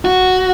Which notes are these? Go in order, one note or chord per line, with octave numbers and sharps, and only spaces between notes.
F#4